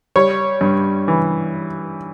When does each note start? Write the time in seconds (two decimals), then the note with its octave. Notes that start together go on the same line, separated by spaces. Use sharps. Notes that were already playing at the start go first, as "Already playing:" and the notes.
0.16 G3 C#5
0.61 G2
1.08 E3